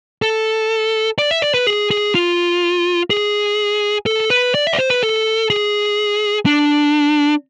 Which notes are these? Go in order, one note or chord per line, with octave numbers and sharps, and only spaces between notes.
A4
D5
E5
D5
B4
G#4
G#4
F4
G#4
A4
B4
D5
E5
D5
C5
B4
A4
G#4
D4